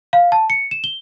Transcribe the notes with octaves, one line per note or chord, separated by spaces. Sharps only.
F5
A5
C#7
E7
G7